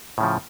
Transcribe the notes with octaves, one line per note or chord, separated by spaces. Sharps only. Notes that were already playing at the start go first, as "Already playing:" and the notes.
A2 C#3 F3